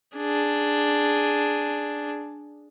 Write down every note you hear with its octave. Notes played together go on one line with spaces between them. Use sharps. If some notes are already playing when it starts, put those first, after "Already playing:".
D4 G#4